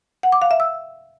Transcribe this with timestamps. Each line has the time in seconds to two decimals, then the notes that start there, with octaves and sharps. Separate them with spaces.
0.23 F#5
0.32 D6
0.42 F5
0.51 E5
0.60 E6